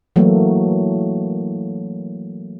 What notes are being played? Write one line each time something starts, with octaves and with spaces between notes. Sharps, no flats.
E3 F#3 A3 A#3